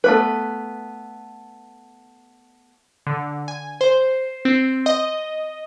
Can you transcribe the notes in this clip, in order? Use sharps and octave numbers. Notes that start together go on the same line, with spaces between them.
A3 B3 B4
D3
G#5
C5
C4
D#5